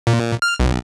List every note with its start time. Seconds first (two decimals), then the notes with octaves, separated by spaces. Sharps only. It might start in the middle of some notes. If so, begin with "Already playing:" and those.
0.07 A#2
0.42 F6
0.60 B1